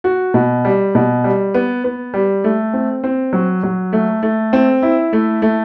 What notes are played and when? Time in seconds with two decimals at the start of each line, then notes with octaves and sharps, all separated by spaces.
0.04 F#4
0.34 B2
0.65 G3
0.95 B2
1.24 G3
1.54 B3
1.84 B3
2.14 G3
2.44 A3
2.73 C4
3.04 C4
3.33 F#3
3.63 F#3
3.93 A3
4.23 A3
4.53 C4
4.83 E4
5.13 A3
5.42 A3